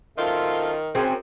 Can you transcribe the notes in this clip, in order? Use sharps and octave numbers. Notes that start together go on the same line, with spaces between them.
F#2 D#3 C4 F4 A4 E5
F#2 C4 G#4 A#4